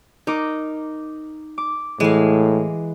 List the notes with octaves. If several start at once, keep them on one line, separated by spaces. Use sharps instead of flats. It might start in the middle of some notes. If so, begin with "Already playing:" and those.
D#4 A#4 D6
D6
A2 E3 G#3 F5